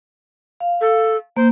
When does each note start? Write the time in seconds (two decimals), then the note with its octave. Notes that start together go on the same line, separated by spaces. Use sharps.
0.60 F5
0.81 A4
1.37 A#3 C5